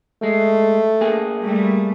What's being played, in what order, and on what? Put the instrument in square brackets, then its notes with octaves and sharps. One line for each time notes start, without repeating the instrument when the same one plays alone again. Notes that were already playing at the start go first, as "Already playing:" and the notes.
[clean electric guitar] G#3 [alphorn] A3
[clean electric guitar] A#3 G#4
[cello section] G3 A3